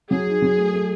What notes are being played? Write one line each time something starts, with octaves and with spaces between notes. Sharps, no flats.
F#3 G#4
D#4
F#3
A3
A3